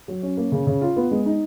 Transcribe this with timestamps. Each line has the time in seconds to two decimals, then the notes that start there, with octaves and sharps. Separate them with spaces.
0.08 F#3
0.23 C#4
0.37 A#3
0.52 C#3
0.67 C#3
0.82 F4
0.96 B3
1.11 G#3
1.26 D#4